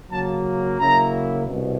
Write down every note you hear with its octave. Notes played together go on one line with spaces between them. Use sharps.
C#3 F#3 A#3 A5
C#3 F#3 A#3 C#4 E4 A#5
C2 B2